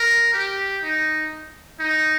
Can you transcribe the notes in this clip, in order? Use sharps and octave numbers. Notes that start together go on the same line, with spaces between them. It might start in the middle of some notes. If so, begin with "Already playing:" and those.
Already playing: A#4
G4
D#4
D#4